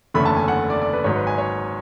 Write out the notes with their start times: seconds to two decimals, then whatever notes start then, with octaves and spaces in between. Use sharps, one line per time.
0.14 F#1 E2 D3 A3 C#4 B5
0.26 A5
0.37 G#5
0.48 F#5
0.70 D5
0.82 D5
0.93 B4
1.04 G#1 G#2 F#3 C#5
1.15 B4
1.27 G#5
1.38 C#5